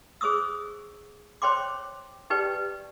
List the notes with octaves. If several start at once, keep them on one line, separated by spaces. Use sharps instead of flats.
G#4 C5 C#6 D#6 E6
C5 C#5 G5 C6 D6
D#4 G4 B4 D5 G5